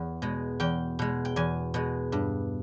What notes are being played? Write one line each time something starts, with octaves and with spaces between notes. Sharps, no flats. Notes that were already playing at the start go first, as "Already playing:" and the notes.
Already playing: E2
B2 G#3
E2 G5
B2 G#3
G5
E2 G#5
B2 G#3
G2